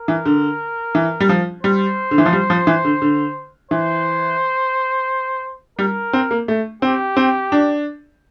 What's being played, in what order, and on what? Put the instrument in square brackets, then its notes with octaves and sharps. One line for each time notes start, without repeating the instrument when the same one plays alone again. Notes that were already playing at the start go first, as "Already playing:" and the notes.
Already playing: [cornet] A#4
[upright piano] E3
D3
E3
G3
F3
[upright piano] G3 [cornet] C5
[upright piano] D3
E3
F3
G3
F3
E3
D3
D3
[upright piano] E3 [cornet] C5
[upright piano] G3 [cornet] A#4
[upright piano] C4
A#3
A3
[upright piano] C4 [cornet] G4
[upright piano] C4
D4